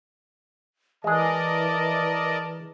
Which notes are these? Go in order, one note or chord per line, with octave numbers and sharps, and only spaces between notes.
E3 G#3 G#4 A#4 D5 D#5 A5